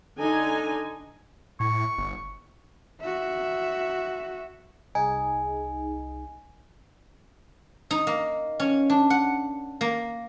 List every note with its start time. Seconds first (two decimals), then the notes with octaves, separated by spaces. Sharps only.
0.19 D3 D#4 G#5
1.60 A2 C#6
1.98 G1
3.01 F#4 E5
4.95 C2 D#4 G#4 G#5
7.91 D#4
8.07 A#3
8.60 C#4
8.90 D4
9.10 F#5
9.81 A#3